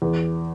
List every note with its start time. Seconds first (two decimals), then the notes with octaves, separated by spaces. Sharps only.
0.02 E2